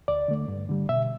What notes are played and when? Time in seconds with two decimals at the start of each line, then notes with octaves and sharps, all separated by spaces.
0.08 D2 D5
0.28 D3 A3
0.48 G2
0.69 D3 G3
0.89 B2 E5